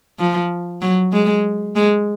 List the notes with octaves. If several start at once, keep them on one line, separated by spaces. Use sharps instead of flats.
F3
F#3
G#3
G#3